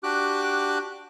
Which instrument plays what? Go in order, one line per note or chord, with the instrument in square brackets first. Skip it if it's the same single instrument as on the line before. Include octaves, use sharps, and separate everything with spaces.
[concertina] D4 F#4 G4 D6 F#6